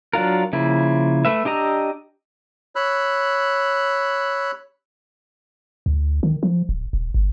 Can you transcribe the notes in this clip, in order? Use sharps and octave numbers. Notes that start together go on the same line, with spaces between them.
F#3 D4 F4 A#4
C#3 F3 A#3 E4
A3 B4 E5
D4 G4 D#5 A#5 E6
C#5 B5 E6 F#6
D2
D#3
F3
D1
D#1
G1